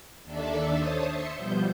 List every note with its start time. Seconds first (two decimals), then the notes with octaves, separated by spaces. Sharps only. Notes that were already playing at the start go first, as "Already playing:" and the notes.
0.24 D#2 D#3 D4 A4 D5 E5
0.74 C5 C#5 A5 D#6
1.06 E5 C6 C#7
1.37 B2 F3 G3 B3 C5 G6